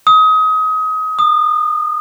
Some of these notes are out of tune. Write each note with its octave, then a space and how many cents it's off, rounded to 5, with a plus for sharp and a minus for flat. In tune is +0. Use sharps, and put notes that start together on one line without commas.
D#6 +25
D#6 -30